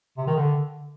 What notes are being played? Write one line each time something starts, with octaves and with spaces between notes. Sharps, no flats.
C3
D#3
D3